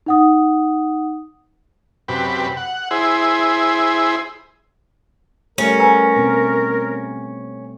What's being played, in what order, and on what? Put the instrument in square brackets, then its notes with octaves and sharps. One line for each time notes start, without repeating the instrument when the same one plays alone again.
[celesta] D#4 F#5 D#6
[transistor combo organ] F#2 C3 G4 B4
F#5
E4 G#4 C5
[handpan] G3 A3 [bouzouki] C#4 [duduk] A#4
[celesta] B4 G#5 A#5
[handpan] B2 B3 C4